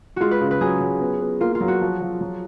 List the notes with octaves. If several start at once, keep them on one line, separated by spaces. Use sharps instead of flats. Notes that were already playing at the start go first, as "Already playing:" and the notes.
G#3 F4 F#4
B4
C#3
B4
F#3 G#4
F#3
B3
B3
A#3 F4
F4
F#3
F#4
F3
F3
F#3